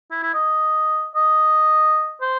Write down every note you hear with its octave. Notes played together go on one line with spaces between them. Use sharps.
E4
E4
D#5
D#5
C5